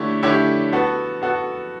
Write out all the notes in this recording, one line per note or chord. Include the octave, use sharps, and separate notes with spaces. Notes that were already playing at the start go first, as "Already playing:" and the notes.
Already playing: D3 A3 E4 G4 C#5
D3 A3 E4 G4 C#5
B3 F#4 A4
B3 F#4 A4